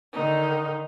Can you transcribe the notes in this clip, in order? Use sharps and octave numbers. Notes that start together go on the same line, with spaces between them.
D3 D#3 D#4